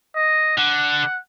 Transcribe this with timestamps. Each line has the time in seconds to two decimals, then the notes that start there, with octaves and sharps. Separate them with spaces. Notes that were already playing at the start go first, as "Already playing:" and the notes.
0.16 D#5
0.58 D3 F#5